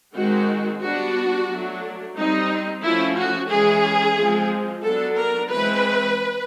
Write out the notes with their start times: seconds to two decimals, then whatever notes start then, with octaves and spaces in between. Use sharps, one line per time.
0.16 D#3 G#3 C4 F#4
0.82 G3 B3 D4 F#4
1.49 F#3 A3 D4
2.17 G3 C4 D#4
2.84 F3 A3 C#4 E4
3.17 F#4
3.50 E3 G#3 C#4 G#4
4.17 F3 G#3 C4
4.84 F#3 B3 D4 A4
5.18 A#4
5.51 E3 G#3 C4 B4